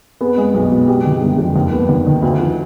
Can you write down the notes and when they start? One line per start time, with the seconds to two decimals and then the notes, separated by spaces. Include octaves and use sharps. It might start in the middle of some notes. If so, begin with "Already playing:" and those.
0.21 B3 G#4
0.38 G#3
0.54 B1
0.71 B2
0.88 G#3 G4
1.05 D#3
1.22 G1
1.39 F2
1.56 D#2
1.72 B3
1.89 D#2
2.06 D#3
2.23 D2
2.40 F3